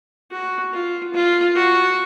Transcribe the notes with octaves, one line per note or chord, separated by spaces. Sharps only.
F#4
F4
F4
F#4